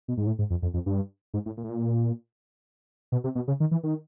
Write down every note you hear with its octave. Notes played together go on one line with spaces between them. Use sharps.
B2
G#2
A2
G#2
F2
F2
F2
G2
G#2
A2
A#2
A2
A#2
B2
C3
B2
C#3
D#3
E3
D#3